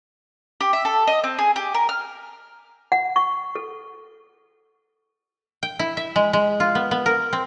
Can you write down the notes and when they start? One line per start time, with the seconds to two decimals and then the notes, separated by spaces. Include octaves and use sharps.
0.61 G4
0.73 E5
0.85 A4
1.07 D#5
1.24 C4
1.39 G#4
1.56 G4
1.74 A#4
1.89 F6
2.92 F#5
3.16 C#6
3.55 A4
5.63 G5
5.79 E4
5.97 E5
6.16 G#3
6.33 G#3
6.60 F4
6.75 B3
6.91 B3
7.06 A#4
7.33 C4